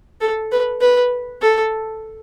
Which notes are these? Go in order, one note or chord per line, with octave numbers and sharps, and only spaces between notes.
A4
B4
B4
A4